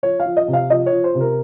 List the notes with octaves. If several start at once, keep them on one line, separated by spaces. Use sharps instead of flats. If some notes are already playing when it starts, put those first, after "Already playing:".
F3 C#5
F5
F3
D#5
C3
F5
F3 D#5
C#5
F3
C5
C3
A#4